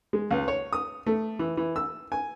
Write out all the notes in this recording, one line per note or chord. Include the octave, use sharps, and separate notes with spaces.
G#3
C#2
C#5
D#6
A3
E3
E3
E6
G#5